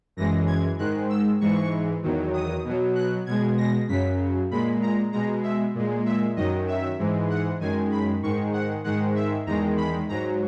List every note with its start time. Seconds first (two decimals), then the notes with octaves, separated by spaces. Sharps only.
0.17 F#2 E3 G#3 A#6
0.47 G#6
0.79 G#2 D#3 G#3 F#6
1.10 E6
1.41 G#2 E3 G#3 C#6
2.03 E2 D#3 F#3
2.34 D#6
2.65 B2 F#3
2.96 F#6
3.26 B2 G#3 G#6
3.58 A#6
3.89 F#2 C#3 F#3 B6
4.51 A#2 G#3 B5
4.82 A#5
5.12 B2 G#3 A#5
5.43 E5
5.75 A#2 G#3
6.06 E5
6.36 F#2 D#3 F#3 D#5
6.68 E5
6.99 G#2 E3 G#3
7.30 F#5
7.60 F#2 D#3 G#3 G#5
7.91 B5
8.23 G#2 D#3 G#3 C#6
8.53 F#5
8.84 G#2 D#3 G#3 F#5
9.16 E5
9.47 E2 D#3 G#3 A#5
9.77 B5
10.09 G#2 F#3 A#5